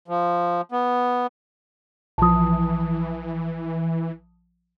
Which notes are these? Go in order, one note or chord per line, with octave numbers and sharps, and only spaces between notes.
F3
B3
A#1 E3 F3 A5 D#6